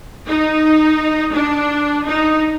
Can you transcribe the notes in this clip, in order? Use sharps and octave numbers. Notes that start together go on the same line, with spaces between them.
D#4
D4
D#4